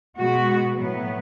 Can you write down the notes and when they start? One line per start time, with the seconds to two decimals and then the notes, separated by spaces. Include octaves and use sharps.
0.17 B2 G#3 B3 F#4
0.78 A2 F#3 B3